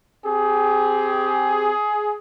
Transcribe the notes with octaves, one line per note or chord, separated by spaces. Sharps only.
C4 G4 G#4